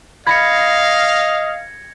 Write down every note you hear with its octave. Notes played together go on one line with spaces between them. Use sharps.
D#5 F5 B5 G#6 A#6 C#7